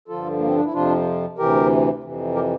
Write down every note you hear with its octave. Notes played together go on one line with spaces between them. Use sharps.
G2 D3 F3 F4 A4
A#3
C4
D4
E4
F2 C3 F3 D4 F4
D2 C3 E3 G4 A#4
F2 C3 E3
G4 A#4